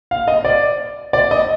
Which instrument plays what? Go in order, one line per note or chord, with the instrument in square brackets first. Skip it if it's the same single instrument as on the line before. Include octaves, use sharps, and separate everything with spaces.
[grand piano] F5
D#5
D5
D5
D#5